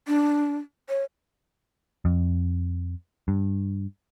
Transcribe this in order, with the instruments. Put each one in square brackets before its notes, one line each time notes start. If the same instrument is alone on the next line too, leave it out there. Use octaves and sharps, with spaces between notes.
[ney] D4
C#5
[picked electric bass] F2
G2